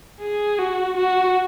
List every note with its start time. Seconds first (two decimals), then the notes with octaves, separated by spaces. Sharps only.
0.21 G#4
0.59 F#4
0.97 F#4